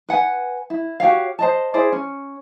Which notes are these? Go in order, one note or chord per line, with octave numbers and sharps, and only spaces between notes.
B4 F#5 G#5
E4
F#4 G4 C#5 F5
C5 D#5 A5
E4 G#4 C5 D5
C#4